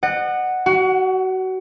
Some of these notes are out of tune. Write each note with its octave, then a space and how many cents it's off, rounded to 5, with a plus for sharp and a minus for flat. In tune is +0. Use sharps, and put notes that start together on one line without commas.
D#5 -40 F#5 +0
F#4 +25 F#5 -10